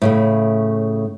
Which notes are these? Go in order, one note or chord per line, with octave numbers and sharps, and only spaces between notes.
A2 C#3 A3